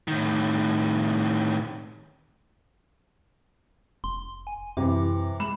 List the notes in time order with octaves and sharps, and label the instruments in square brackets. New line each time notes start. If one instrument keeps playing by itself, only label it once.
[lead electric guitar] A2 D#3
[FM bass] F1 [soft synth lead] C6
[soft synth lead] G#5
[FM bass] F#2 [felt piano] C3 E3 [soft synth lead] D6
[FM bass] G#3 [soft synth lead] B5 [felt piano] E7